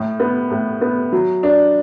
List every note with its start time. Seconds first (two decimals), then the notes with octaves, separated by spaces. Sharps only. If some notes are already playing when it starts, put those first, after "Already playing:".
Already playing: A2
0.20 B3
0.51 A2
0.81 B3
1.12 F#3
1.43 D4